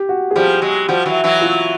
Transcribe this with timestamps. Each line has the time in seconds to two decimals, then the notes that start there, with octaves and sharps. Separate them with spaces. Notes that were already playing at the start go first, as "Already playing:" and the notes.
Already playing: G4
0.09 F#4
0.31 G#4
0.36 F3 G3 G4
0.62 F#3 G#3
0.88 F3 G3 F#4
1.06 E3 F#3
1.24 E3 F#3
1.41 F4